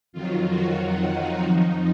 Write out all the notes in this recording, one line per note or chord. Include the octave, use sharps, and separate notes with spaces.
F2 D#3 F#3 F4
F#4
F4
D#4
F2 F3 D#4